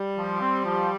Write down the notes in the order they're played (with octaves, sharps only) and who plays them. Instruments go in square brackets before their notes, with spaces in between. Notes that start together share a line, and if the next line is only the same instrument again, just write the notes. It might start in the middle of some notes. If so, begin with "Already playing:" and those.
Already playing: [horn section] G3
[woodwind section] F3
C4
F3